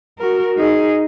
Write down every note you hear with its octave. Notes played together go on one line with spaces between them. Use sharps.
F#4 A#4
D#4 G#4